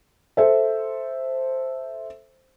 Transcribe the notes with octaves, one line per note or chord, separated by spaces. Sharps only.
A4 C5 E5